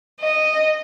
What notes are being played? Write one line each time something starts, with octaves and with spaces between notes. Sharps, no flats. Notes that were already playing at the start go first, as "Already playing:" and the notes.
D#5